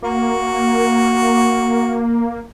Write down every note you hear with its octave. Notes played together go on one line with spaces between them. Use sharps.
A#3 F#4